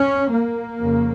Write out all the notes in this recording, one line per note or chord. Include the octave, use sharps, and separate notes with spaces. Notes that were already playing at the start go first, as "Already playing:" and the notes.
Already playing: C#4
A#3
F2 C#3